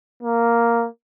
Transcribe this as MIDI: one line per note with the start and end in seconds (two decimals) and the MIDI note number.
0.23 0.86 58